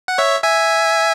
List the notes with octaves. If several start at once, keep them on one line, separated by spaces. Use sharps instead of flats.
F#5
C#5 E5
E5 G#5